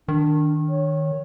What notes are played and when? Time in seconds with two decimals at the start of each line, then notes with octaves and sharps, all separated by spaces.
0.08 D#3 D4
0.69 C#5